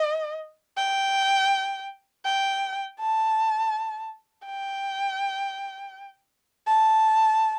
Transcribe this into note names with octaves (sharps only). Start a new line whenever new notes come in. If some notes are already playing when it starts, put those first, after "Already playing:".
Already playing: D#5
G5
G5
A5
G5
A5